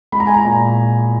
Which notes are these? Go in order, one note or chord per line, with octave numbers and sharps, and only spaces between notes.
G#3 B5
A#5
G#5
A#5
A#2